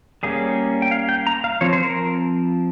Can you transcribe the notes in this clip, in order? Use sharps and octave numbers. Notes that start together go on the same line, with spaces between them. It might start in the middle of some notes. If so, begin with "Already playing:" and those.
G3 A#3 C#4 G#4
G5
F5
G5
A#5
F5
F3 C4 C#5
C5
A#4